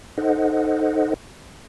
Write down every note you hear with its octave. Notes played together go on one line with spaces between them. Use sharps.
D#4 A4 C5 D#5 F#5